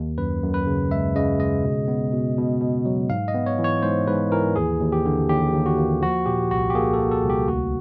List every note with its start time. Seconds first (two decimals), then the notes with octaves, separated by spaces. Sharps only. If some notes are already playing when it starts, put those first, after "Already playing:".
Already playing: D#2
0.18 F#2 B4
0.43 F#2
0.54 B4
0.66 C#3
0.91 G#3 E5
1.16 C#3 D#5
1.39 G#3 D#5
1.63 B2
1.88 B3
2.12 B2
2.38 B2
2.61 B2
2.85 F#3
3.10 G#2 F5
3.28 D#5
3.35 B3
3.46 C#5
3.59 E3
3.64 C#5
3.83 G#2 C5
4.07 G#2 B4
4.32 E3 A#4
4.56 D#2 G#4
4.81 D#2
4.92 G4
5.05 D3
5.29 D#2 G4
5.53 D#2
5.66 F#4
5.78 A#3
6.02 F3 F#4
6.26 A#2 G4
6.51 C2 F#4
6.70 G4
6.75 A#3 G#4
6.94 A4
6.99 A#3
7.11 A4
7.24 C2
7.29 G4
7.48 D2 F#4